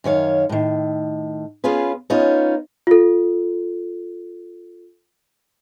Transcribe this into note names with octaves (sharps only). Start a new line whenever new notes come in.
F#2 D#3 C#5 F5
A2 D#3
B3 C#4 F4 G#4 B4
B3 C#4 D#4 F4 C#5
F4 A4